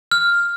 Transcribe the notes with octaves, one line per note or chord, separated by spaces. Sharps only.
F6